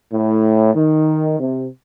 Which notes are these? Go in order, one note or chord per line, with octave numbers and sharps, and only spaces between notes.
A2
D#3
C3